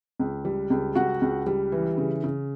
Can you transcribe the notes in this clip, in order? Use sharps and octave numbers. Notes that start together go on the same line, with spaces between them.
C#2
G3
C#2
C#2 F#4 F#5
C#2
G3
E3
C#3
C#3